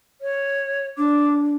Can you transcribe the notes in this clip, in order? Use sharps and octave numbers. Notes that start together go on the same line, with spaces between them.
C#5
D4 D6